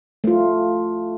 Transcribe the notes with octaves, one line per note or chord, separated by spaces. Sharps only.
A3 F4